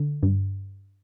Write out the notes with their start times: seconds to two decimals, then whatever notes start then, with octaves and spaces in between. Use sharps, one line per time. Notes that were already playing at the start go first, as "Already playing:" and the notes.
Already playing: D3
0.23 G2